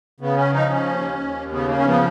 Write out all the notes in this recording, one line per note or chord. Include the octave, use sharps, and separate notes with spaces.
C#3 B3
C#4
F3 D#4
C#4
D#2
D#2
C#3 B3
A#3
C#4
F3 B3